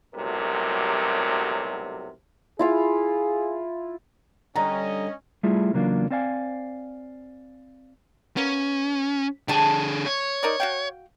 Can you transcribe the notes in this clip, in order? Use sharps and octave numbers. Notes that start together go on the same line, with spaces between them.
B1 A2 C3 F#3 G3 A#4
E4 F4 G#4 F5
D3 G3 C#4 D#5 A#5
G3 A3 E4 F4 G#4
E2 C#3 F#3 A#3 D4 F4
C4 C5 D5 F5 G#5
A#3 B3 C#4
D3 G3 G#4 A5
C#5
D#4 A#4 D5
F#4 F5 G5